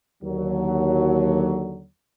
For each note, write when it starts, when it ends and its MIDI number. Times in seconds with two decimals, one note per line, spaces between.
0.23 1.86 39
0.23 1.86 50
0.23 1.86 54